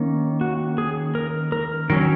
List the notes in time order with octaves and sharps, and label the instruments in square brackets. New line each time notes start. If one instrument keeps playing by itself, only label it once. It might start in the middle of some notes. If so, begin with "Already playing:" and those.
Already playing: [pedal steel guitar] D#3 A#3 C#4
F#4
G#4
A#4
A#4
D#3 F#3 C#4 A#4